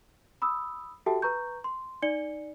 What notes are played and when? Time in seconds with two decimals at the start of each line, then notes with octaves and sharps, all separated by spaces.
0.42 B5 D#6 E6
1.06 F#4 G4 A4 E5 G5 A5
1.22 B4 A#5 C#6 G6
1.64 C6
2.02 D#4 D5 C#7 G7